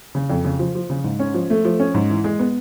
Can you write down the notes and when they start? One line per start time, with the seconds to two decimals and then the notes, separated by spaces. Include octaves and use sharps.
0.15 C#3
0.30 F2
0.45 C#3
0.59 F3
0.75 F3
0.90 C#3
1.04 G#2
1.19 C#4
1.34 F3
1.50 A3
1.65 F3
1.80 C#4
1.94 G#2
2.10 E3
2.24 G#3
2.39 B3